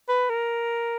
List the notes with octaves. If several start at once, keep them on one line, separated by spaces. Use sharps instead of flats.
B4
A#4